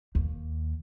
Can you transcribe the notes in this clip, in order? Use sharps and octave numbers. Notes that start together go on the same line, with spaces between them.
D#2